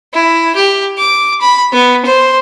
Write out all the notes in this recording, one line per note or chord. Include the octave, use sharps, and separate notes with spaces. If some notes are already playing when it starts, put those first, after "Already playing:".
E4
G4
D6
B5
B3
C5